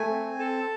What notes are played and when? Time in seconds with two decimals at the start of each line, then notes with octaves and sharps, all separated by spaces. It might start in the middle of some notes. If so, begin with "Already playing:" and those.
Already playing: A3 G#5
0.09 C4
0.39 A4 A5